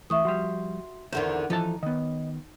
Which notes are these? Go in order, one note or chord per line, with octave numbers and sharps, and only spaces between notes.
E3 A3 E5 C#6 D#6
F3 G3 F#4 C6
E2 D3 D#3 C5
E3 F3 D#4 E4 A4 A5
D#3 B3 D#5